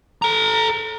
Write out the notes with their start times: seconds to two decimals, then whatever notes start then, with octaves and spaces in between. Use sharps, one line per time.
0.22 A4 A#5